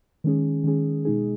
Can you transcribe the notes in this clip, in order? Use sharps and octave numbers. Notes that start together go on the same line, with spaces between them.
D#3 G#3 C#4 G#4
D#3 G#3 C#4 G#4
B2 G#3 D#4 G#4